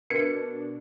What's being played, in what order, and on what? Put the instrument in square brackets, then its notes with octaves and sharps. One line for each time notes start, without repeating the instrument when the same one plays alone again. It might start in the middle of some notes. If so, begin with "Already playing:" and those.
[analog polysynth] B2 D4 [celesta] A#4 B4 G#6 [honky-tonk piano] C#7